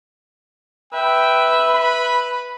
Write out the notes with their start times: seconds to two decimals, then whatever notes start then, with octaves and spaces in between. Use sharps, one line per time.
0.93 B4 E5 G5
1.75 B5